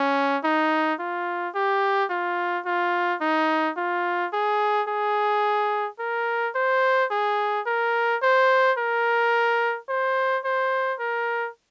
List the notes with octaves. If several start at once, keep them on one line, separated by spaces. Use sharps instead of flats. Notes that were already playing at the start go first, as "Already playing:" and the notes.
Already playing: C#4
D#4
F4
G4
F4
F4
D#4
F4
G#4
G#4
A#4
C5
G#4
A#4
C5
A#4
C5
C5
A#4